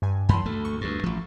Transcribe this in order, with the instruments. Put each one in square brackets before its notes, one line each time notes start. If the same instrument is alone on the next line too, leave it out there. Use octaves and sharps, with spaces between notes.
[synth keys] G2 G#5
[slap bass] F#2 E3 [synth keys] A5 B5 C6
[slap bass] D2 A3
[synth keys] C#6
[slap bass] D2 G2
A1 F3